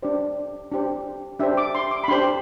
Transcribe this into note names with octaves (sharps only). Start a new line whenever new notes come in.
D4 G4 C5 D5
D4 G4 C5
D4 G4 C5 E5
D6
C6
D6
B5
D4 G4 C5 C6